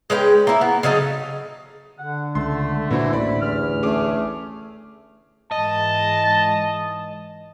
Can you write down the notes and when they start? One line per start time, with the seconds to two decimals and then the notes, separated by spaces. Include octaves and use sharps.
0.10 G#3 C#4 B4 G5
0.47 A#3 E4
0.61 B3
0.83 C#3 F#3 D#4 A4
1.99 D3 F#5
2.35 C#2 A3 C6
2.91 A#2 E3 A#3 D4 E4 F#4 C5
3.13 A1 D2 A2 E4 C5 D5 B5
3.42 E2 F6
3.83 A3 C#4 G#4 D6
5.52 G#2 E3 G#3 D#5 A5